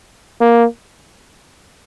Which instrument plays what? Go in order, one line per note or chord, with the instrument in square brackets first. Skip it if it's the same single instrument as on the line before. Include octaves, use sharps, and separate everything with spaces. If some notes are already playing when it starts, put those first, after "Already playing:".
[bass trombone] A#3